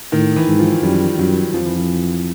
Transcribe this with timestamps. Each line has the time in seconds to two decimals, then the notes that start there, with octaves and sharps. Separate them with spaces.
0.12 A2 D#3
0.36 E3
0.48 G#2
0.59 F3
0.82 F#2 G3
1.18 F#2 F#3
1.54 F2 F3
1.66 E3
1.77 F3